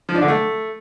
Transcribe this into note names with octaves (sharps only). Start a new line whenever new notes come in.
F3
D4
D3
A3